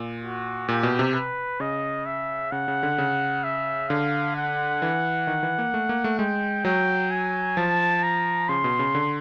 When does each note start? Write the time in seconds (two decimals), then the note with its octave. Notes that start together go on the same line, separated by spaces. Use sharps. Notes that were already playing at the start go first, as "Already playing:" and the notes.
Already playing: A#2
0.23 F#4
0.68 A#2 G4
0.83 B2
0.99 C3
1.14 B4
1.60 C#3 D#5
2.06 E5
2.52 C#3 F#5
2.68 C#3
2.83 D3
2.98 C#3
3.44 E5
3.89 D3 F5
4.36 F#5
4.82 E3
5.27 D#3
5.43 E3
5.59 A#3
5.74 A3
5.89 A#3
6.04 A3
6.19 G#3 G5
6.65 F#3 G5
7.11 G#5
7.57 F3 A5
8.03 A#5
8.49 C#3 C6
8.64 B2
8.79 C#3
8.95 D3